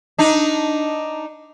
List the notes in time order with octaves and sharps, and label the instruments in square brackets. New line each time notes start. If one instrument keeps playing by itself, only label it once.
[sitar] D4 D#4